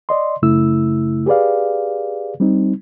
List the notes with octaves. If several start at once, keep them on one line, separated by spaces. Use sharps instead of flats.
D5 D#5 C6
F#2 C#3 A3 E4 E6
G4 G#4 B4 D5 F5
G3 C4 D#4